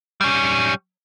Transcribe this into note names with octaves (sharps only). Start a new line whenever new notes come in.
G3 C#4